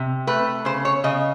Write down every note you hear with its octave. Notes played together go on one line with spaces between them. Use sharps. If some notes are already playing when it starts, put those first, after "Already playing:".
Already playing: C3
A3 B4
C#3 C5
C#5
C#3 D#5